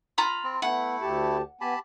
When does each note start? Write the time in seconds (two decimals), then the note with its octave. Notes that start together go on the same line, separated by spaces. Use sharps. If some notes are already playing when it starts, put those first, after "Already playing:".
0.18 F4 A#5 B5
0.44 C4
0.62 A3 B3 E4 F#5
1.01 D2 G4 A5
1.61 B3 G4 G#5 A5 B5